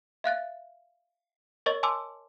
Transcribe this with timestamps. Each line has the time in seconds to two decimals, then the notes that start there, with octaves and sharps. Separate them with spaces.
0.24 E5 F5 F#6 A6
1.66 A#4 C#5 D#5 C#6 A6
1.83 G#5 A5 C6 D6 E6